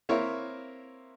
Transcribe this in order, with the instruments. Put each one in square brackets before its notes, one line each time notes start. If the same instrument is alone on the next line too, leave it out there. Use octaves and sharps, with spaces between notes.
[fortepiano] A#3 C4 E4 A#4 C#5 E5